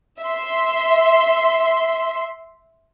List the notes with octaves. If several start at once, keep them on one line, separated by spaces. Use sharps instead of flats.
E5 C6